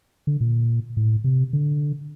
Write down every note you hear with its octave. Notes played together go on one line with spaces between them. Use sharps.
D3
A#2
A2
C3
D3